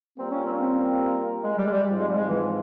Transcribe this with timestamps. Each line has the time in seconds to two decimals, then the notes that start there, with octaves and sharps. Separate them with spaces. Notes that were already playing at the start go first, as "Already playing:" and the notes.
0.18 G3 A#3 C4 F4 A#4
0.32 C#4
0.45 C4
0.53 C#4
0.60 C4
1.43 G#3
1.58 G3
1.66 G#3
1.72 G3
1.87 G#2 F3 C4 F4
2.00 G#3
2.08 G3
2.14 G#3
2.28 E3